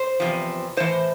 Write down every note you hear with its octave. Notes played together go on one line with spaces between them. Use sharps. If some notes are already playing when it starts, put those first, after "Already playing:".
Already playing: C5
E2 C3 F3
A2 E3 C5